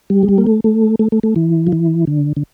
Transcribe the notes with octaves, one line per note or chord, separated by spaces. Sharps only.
G3
G#3
G3
A#3
A3
A3
A3
A3
A3
E3
F3
E3
D3
D3